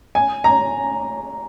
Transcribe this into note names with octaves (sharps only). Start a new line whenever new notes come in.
G#5
A#5